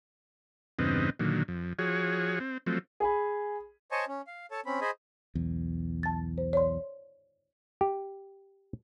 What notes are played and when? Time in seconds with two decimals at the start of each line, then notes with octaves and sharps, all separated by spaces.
0.79 E2 G2 C#3 B3 C4 D#4
1.19 A#2 D3 D#3 F#3
1.48 F2
1.79 F3 F#4 G#4 C#5
2.40 C4
2.66 F3 F#3 A3 C4
3.00 G#4 G#5 B5
3.92 C5 C#5 D#5 G#5 A5 C#6
4.08 C#4
4.27 F5
4.51 A4 C#5 A5
4.66 C4 C#4 B5
4.81 G#4 C5 D#5 G#5 B5
5.35 B1 E2
6.03 A5 A6
6.38 C5
6.53 C#5 D5 C6
7.81 G4